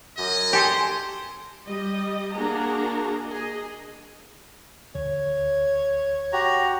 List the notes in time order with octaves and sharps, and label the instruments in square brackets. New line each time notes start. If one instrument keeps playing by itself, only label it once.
[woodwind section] F#2 [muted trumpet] D#5
[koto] G4 A4 [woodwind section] G#5 C6
[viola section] G3 D#5
A#3 D4 F#4 G#4 A#5
G#4 D#5
[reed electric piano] D2 [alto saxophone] C#5
[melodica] F#4 G4 A#5